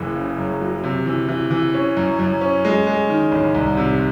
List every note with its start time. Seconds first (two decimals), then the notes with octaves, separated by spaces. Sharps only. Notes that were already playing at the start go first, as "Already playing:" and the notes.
Already playing: F#1 E3
0.15 C#3
0.38 F#2
0.61 F#3
0.83 C3
1.06 E3
1.28 E3
1.51 E3
1.74 C#4
1.97 F#2
2.19 F#2
2.41 C#4
2.65 G#3
2.87 G#3
3.10 D#3
3.32 A1
3.54 C2
3.77 C3